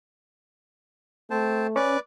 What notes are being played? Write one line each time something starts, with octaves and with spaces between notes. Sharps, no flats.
A3 C4 C5 A5
C#4 B4 D5 D6